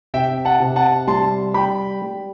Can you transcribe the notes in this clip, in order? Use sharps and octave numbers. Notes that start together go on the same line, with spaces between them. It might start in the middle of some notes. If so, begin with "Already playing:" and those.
C3 E5 G5
F#5 A5
C3
F#5 A5
G3 A5 C6
G3 G5 B5
G3